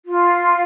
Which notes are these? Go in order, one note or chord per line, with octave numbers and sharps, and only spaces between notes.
F4